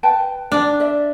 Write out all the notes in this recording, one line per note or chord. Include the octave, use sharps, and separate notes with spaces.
B4 G5 A5
D4
D5 E5